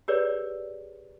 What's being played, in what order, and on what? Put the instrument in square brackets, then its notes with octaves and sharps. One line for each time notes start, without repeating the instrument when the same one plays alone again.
[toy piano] G4 G#4 A#4 B4 C#5 D5